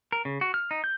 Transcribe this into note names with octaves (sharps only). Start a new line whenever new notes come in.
A#4
C#3
F#4
F6
D#4
G6